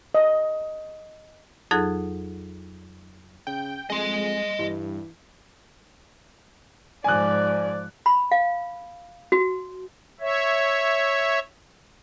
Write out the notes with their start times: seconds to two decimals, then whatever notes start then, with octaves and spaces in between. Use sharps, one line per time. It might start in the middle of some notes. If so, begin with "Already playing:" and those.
0.15 D#5
1.71 F2 F#3 D#4 G#4 A4 F#6
3.47 C#3 G5
3.90 F2 G#3 D#5 C6
4.59 G2 E3
7.04 G#2 F3 D5 G#5 F#6
8.06 B5
8.32 F5
9.32 F#4
10.20 C#5 E5